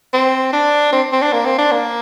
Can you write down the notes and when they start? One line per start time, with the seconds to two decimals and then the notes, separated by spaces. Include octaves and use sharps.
0.13 C4
0.53 D4
0.93 C4
1.12 C4
1.22 D4
1.32 A#3
1.45 C4
1.58 D4
1.72 A#3